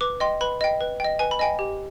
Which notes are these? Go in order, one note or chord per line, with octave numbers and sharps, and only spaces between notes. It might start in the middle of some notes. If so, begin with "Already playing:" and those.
B4 D6
D#5 G5 C6
B4 B5
D#5 G5
B4
D#5 G5
B4 G#5
B5
D#5 G5 G#5
G4